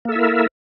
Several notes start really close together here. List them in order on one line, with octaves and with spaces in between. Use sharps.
A#3 A4 E5 E4 A#4